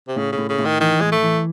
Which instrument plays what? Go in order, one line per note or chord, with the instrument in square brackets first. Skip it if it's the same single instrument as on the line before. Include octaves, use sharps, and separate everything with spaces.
[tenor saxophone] C3
[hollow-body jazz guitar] A2 [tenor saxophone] C#3
[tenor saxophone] C#3
[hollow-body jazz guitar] A2
[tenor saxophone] C#3
[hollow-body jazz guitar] A2
[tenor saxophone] D#3
[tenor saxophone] D#3 [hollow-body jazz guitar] E3
[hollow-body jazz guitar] A2 [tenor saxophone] G#3
[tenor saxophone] A3
[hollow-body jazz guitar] E3